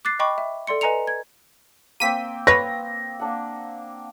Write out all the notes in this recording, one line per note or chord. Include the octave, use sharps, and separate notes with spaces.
D6 F#6 A6 C7
D#5 G5 B5 C#6 D6
E5
A4 D5 C6 C#7
B4 D#5 G#5 A#5 C#7 F7
G#6
A#3 C4 G5 B6 D#7
B4 C#5 A#6
A#3 D4 F#5